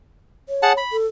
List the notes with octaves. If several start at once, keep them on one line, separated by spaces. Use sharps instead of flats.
C#5
G#4 F#5 A5
B5
A4